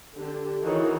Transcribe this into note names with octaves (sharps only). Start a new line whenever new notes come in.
D3 G4
D#3 E3 D#4 F#4 G#4 C#5